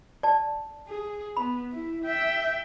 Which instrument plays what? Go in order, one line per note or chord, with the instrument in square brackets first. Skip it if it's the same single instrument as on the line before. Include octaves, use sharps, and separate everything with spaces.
[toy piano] D5 A5
[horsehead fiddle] G#4
[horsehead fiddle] B3 [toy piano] B5
[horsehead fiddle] E4
E5 G5